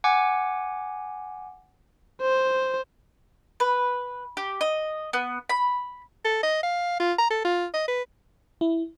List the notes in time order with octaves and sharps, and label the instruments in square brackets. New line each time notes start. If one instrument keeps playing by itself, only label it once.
[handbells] F#5 G#5 D6
[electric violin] C5
[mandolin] B4
G4
D#5
B3
B5
[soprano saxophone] A4
D#5
F5
F4
A#5
A4
F4
D#5
B4
[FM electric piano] E4